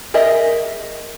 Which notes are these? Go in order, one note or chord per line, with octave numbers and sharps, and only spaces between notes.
G4 G#4 A#4 D#5 E5